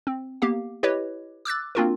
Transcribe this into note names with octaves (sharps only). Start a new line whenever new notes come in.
C4
A#3 B3 G4 F5
E4 G4 B4 C#5 D#5
D6 E6 F#6 A6
A#3 C4 D4 F4 F#4 A#4